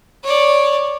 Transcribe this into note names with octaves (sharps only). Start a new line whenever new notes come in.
C#5 D5